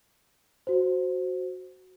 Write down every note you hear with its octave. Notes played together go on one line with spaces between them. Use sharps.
F#4 C5